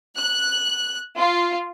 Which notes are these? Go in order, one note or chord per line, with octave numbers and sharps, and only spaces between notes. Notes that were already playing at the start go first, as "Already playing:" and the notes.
F#6
F4